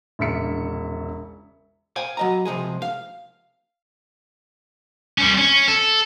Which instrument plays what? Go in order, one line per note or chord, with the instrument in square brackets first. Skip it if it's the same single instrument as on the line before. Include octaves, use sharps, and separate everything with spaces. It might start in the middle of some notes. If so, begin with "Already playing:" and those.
[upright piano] E1 A#1 C#3 E5 B6 C#7
[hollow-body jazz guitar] C5 F5 G5 G#5
F#3 D#5 A#5
C3 F3 G#3 G#4
F5
[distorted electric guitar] G3 C#4
C#4
A4